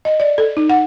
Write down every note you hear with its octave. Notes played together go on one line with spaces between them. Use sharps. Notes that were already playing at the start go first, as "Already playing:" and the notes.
D#5
D5
A4
D#4
F#5